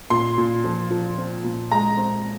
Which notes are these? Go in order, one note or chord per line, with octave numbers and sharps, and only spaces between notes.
A#2 C6
A#2
F3
F3
C4
A#2
G#3 A#5
C4